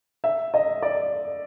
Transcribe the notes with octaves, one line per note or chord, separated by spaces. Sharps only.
E5
D#5
D5